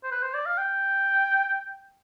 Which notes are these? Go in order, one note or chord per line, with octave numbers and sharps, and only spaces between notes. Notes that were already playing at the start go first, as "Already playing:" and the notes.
C5
B4
C5
D5
F5
G5